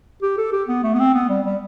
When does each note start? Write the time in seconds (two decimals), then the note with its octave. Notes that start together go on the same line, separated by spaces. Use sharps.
0.22 G4
0.38 A4
0.52 G4
0.68 B3
0.83 A3
0.94 B3
0.99 C4
1.14 B3
1.29 G3
1.45 G3